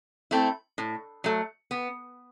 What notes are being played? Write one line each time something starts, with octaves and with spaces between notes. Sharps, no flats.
A3 C4 E4
A2
F#3 A3
B3